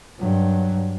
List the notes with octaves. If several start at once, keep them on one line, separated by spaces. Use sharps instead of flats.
G2 F#3